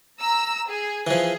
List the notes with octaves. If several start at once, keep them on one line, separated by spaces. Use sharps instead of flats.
A#5 E6
G#4
E3 F3 G#4